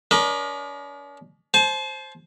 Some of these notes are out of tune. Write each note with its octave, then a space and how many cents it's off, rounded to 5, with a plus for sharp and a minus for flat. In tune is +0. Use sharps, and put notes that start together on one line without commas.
C#4 +45 A#4 +35 D#5 -35
C5 +10 A5 -40